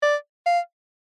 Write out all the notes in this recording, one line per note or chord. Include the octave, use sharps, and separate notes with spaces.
D5
F5